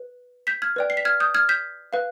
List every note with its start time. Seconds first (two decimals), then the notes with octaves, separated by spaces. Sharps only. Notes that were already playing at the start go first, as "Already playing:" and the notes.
Already playing: B4
0.47 G6 B6
0.62 F6 G#6
0.76 B4 D5 G5
0.90 C7
0.97 B6
1.05 F6 G#6
1.20 D#6 G6
1.35 F6 G#6
1.49 G6 B6
1.93 B4 F5